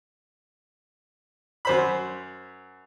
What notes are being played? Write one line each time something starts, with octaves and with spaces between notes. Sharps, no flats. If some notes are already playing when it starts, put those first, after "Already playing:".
F#2 C5 B5